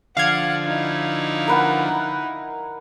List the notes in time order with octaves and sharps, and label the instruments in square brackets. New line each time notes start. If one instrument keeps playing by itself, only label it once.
[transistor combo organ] D3 F3 [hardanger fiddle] D5 F#5 [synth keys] F5 G#6
[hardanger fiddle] D#4 E4
[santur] A#4 B4 F#5